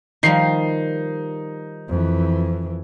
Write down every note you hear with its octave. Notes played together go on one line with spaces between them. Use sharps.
D#3 F3 G3 D#4 C7
F2 E3